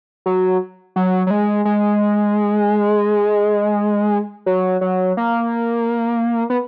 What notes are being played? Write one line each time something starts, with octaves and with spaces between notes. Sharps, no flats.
F#3
F#3
F#3
G#3
G#3
F#3
F#3
A#3
B3